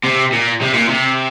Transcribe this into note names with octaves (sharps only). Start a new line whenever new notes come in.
C3
A#2
C3
A#2
C3